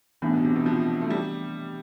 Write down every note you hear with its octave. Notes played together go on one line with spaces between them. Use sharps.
A2 E3 B3 D4
B2
C3
B2
F3
A3
G3